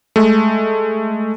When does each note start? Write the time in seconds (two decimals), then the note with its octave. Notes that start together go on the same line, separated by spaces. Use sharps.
0.16 G#3 A3